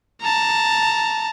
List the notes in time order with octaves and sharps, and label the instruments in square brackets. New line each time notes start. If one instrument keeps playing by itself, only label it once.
[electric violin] A5 A#5